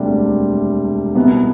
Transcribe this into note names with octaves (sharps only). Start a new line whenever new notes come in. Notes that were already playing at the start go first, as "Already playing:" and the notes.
Already playing: E1 D2 C3 G3 D4
C2 B2 B3